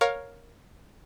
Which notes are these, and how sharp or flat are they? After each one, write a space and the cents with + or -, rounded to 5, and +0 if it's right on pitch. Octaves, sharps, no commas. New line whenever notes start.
A#4 +5 C#5 +0 F5 +20